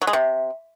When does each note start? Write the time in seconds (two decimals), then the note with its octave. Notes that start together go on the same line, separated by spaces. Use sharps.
0.02 F#3
0.07 G#3
0.13 C3